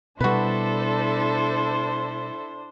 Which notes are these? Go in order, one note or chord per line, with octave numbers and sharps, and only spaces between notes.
B2 G3 D4 E4 F#4 A4 B4 C5